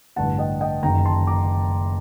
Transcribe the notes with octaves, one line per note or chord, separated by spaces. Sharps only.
A1 G2 D3 F#5 A5
D#5 G5
D#5 G5
F#1 F#2 D#3 G5 A#5
A5 C6
A#5 D6